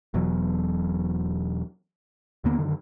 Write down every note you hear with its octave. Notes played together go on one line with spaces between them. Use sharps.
E1 E2 B2 F#3
D#2 D3 A#3 B3
F#2 D3 D#3